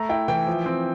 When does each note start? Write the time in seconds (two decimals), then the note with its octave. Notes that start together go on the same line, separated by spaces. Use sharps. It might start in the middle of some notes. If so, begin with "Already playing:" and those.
Already playing: A3 A#5
0.09 E4 G5
0.28 E3 G5
0.47 F3
0.66 C4